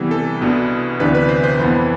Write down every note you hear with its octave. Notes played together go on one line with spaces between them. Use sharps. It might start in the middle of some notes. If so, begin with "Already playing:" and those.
Already playing: C3 E3 G3 B3
A4
C2 B2 B3 D4
D2 C3 E3 B3 D4 B4
B4
C5
C5
F2 E3 B3